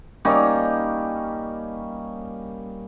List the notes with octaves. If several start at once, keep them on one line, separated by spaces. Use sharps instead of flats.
G3 A#3 C#4 D#4